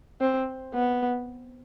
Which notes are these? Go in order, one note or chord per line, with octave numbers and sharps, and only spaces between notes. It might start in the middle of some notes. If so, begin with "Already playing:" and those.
C4
B3